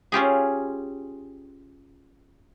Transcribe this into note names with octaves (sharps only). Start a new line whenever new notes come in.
C#4 F4 G4 G#4